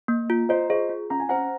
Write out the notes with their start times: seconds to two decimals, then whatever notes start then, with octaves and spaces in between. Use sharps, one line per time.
0.08 A#3
0.30 F4
0.49 F4 C5 D#5
0.69 G#4 C5 D#5
0.89 F4
1.10 C#4 A#5
1.20 G#5
1.29 C5 F#5 A#5